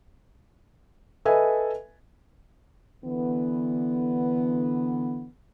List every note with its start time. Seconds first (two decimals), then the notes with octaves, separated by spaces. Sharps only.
1.25 A4 B4 D#5 E5 G#5
3.04 D3 E3 B3